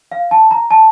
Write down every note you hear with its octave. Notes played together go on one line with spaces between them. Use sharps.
F5
A5
A#5
A5